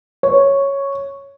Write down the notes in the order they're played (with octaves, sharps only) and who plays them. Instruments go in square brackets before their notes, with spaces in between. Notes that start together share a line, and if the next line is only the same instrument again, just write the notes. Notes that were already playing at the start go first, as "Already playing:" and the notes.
[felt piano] C#5